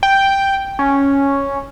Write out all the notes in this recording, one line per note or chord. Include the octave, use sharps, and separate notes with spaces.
G5
C#4